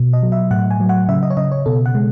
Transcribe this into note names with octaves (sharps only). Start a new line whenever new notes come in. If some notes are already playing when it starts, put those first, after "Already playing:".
Already playing: B2
D#5
F#3
E5
A2 F#5
G#5
F#3
F#5
C#3 E5
D#5
C#5
C#3 D#5
C#5
B2 A4
F#5
G#3